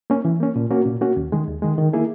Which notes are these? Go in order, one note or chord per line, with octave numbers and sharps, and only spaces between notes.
A#3 C#4
E3
A#3 C#4
A#2
A#3 C#4 F#4
A#2
A#3 C#4 F#4
D#2
D#3 G#3
D#2
D#3 G#3
D#3
A#3 E4 G#4